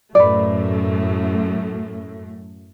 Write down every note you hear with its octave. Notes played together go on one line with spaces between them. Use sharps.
F#2 A2 A3 B4 D5